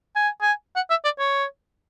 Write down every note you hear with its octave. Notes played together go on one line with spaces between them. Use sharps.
G#5
G#5
F#5
E5
D5
C#5